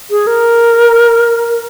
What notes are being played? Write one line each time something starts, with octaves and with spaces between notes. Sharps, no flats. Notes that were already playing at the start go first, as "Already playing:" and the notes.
G#4
A#4